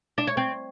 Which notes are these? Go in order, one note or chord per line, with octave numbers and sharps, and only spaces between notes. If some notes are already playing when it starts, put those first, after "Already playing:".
D4
C#5
C4